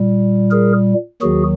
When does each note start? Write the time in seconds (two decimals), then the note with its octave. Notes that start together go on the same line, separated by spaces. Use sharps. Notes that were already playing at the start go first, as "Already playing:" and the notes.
Already playing: A#2 G3
0.51 G#4 A#4
1.22 D#2 D#3 F#3 F#4 G#4